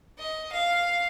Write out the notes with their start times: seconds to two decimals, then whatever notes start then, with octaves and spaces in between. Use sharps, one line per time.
0.19 D#5
0.52 F5